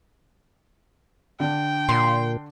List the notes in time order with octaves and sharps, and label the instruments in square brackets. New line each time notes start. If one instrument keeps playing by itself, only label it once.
[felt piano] D3 D4 [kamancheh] G5
[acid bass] A#2 [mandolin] C6